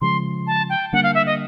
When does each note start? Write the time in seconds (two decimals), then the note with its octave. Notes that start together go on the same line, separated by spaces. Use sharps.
0.01 C#3 F3 G#3 C6
0.47 A5
0.69 G5
0.92 D3 G3 A#3 D4 F#5
1.03 F5
1.14 E5
1.26 D#5